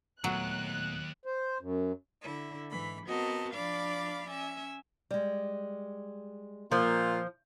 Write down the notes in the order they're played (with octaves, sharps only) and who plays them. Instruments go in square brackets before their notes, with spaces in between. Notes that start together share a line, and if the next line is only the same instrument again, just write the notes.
[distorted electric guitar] D#2 [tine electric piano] A#2 A3 B3 [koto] F#3 [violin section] F#6
[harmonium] C5
F#2
[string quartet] D3 E4
G#2 E3 B5
B3 C4 F#4 A#4 D#5 A5
F3 D4 D5 F5 B5 D6
C#4 E5 G#5
[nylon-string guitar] G3 G#3
[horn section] A#2 A#3 F4 [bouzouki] F3